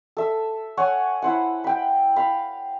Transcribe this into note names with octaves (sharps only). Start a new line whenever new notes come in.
A4 E5
C#5 F#5 G#5
E4 C5 F#5
G5 B5
F5 B5